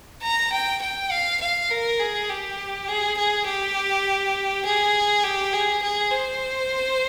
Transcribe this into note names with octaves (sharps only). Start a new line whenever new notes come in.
A#5
G5
G5
F5
F5
A#4
G#4
G4
G#4
G#4
G4
G#4
G4
G#4
G#4
C5